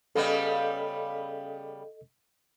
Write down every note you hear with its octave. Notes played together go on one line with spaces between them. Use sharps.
C#3 G3 B3 A4 D#5